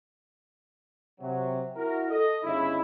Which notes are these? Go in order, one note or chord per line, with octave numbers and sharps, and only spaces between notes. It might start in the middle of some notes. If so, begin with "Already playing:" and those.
C3 F#3
E4 F#4 A#4
A4 D#5
G1 C#3 D#4 E4